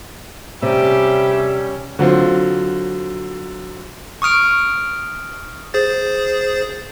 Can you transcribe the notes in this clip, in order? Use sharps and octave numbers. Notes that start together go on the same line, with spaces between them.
C3 G3 C#4 G4 E5
D3 F#3 C4 F4 C5
C#6 D#6 F6 D7
G#4 C5 A6